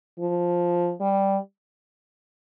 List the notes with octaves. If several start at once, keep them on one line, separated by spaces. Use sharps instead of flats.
F3
G3